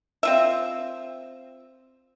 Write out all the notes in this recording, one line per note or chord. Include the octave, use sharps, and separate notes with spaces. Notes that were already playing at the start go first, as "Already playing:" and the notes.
C4 F4 E5